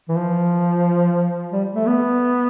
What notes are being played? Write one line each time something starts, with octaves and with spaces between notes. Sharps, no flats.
E3
F3
G3
A3
B3